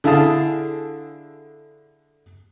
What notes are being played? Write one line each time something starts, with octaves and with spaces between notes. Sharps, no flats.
D3 E4 G#4 F5 A5 D#6